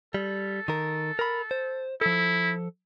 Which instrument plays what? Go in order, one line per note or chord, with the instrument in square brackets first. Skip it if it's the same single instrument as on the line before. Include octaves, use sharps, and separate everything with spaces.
[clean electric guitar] G3 [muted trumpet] A4
[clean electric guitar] D#3 A#4
A#4 B5
C5
[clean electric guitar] F3 A4 [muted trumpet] E4